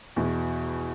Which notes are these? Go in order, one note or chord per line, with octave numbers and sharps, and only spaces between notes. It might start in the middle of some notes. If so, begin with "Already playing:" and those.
E2 B2